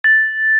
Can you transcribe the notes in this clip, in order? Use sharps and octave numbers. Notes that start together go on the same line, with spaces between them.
A6